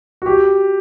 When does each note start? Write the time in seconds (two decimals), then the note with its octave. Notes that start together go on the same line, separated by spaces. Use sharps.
0.22 F#4
0.26 G4